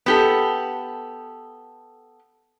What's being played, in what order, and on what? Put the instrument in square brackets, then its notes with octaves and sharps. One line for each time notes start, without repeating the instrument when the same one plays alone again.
[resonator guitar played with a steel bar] B3 G4 A4